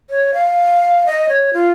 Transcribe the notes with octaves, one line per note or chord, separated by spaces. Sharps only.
C#5
F5
D#5
C#5
F4